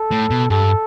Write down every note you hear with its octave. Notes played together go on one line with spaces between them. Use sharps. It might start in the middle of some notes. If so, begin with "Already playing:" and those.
Already playing: A4
A2
B2
G2 A4